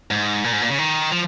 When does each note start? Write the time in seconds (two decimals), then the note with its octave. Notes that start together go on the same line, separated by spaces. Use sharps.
0.11 G#2
0.44 A#2
0.53 G#2
0.62 A#2
0.70 C#3
0.78 D#3
1.12 F3